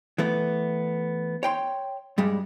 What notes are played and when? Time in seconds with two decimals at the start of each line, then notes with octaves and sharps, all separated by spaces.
0.18 E3 A3 B3
1.43 C#5 G5 C6
2.18 G2 G3 G#3